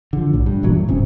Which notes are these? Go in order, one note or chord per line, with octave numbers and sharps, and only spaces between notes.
D3 F3
B1 A2
G2
G1 A#2 E3 F#3
F#2
D1 G#2 C3 C#4